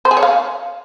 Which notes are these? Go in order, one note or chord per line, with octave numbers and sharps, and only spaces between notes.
C5
G#4
C#5
F5